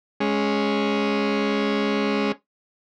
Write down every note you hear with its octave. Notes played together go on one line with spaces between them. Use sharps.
G#3 C#4